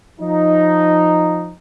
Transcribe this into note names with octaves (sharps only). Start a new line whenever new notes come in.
F3 D#4